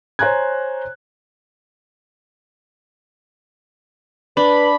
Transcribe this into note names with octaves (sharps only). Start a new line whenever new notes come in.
C5 C#5 G#5 A#5 F#6 G#6
D4 B4 B5